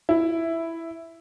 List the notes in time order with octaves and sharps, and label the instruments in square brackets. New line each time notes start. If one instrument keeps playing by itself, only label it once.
[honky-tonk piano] E4